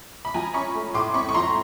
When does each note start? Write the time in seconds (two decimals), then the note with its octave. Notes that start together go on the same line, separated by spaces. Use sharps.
0.25 B5
0.34 F3 G#5 A#5
0.54 C#4 B5 C#6
0.74 A3
0.94 A2 C6 D6
1.14 C4 B5 C#6
1.29 C#6
1.34 F3 A#5 C6